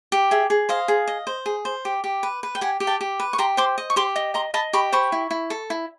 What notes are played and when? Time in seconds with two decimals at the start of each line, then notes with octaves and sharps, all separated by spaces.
0.12 G4
0.31 G#4 E5
0.50 G#4
0.69 C5 D#5 F5
0.88 G#4
1.08 D#5
1.27 C5
1.46 G#4
1.65 C5
1.85 G4
2.04 G4
2.23 B4
2.43 B4
2.55 G5
2.61 G4 F#5 G#5
2.80 G4
2.87 G5 A5
3.01 G4
3.20 B4
3.33 C#6
3.38 G4 A#5 C6
3.57 C5 C6 D6
3.78 D#5
3.90 C#6
3.96 G4 C6 D6
4.16 D#5
4.34 D#5 A#5 C6
4.54 D#5 A5 B5
4.73 G4 B5 C#6
4.92 C5 B5 C#6
5.12 E4
5.31 E4
5.50 A4
5.70 E4